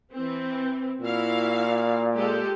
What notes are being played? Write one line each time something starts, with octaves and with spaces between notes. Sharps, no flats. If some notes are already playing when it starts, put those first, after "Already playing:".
E3 C4
A#2 E4 F#4 F5
G#3 G4 A4